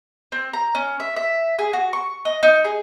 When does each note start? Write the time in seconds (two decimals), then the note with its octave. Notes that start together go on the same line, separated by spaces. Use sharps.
0.32 C4
0.53 A#5
0.75 C#4
1.00 E5
1.16 E5
1.59 G#4
1.73 F#4
1.93 C#6
2.25 D#5
2.43 D#4
2.65 G#4